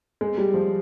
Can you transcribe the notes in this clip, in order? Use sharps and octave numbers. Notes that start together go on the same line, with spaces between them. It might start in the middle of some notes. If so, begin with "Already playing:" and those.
G#3
G3
F3